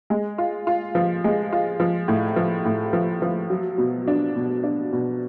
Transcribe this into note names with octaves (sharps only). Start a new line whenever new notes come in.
G#3
F4
F4
F3
G#3
F4
F3
A2
F3
A2
F3
F3
F#3
B2
D4
B2
D4
B2